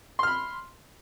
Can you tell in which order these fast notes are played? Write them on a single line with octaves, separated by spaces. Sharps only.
C6 F6 B5